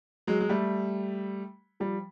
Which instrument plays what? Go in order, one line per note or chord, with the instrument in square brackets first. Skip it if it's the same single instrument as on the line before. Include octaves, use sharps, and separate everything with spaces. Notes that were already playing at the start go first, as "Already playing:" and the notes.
[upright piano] F#3 G#3
G#3
G3 A3
F3 G3